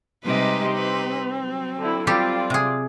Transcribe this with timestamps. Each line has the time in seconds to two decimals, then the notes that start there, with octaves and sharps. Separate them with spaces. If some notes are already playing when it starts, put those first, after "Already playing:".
0.25 C3 G3 G#3 D#4 G4 B4 D#5 C6
0.74 C4 B4
1.40 F#3
1.79 D3 E4
2.07 G3 C4 F4 G4 A4 D5
2.50 C3 G#4